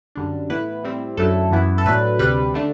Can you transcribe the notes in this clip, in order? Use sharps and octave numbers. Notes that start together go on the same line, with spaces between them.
F#2 D3 G3 D4
A2 E3 B3 E4 B4
A2 G3 C4 E4
F#2 D3 F#3 A3 E4 A4
F#2 E3 B3 E4
A4
A2 F#3 A3 D4 B4
D2 C3 G3 B4
D3 A3 D4